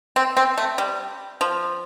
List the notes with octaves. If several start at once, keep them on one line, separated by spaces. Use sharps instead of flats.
C4
C4
A3
G3
F3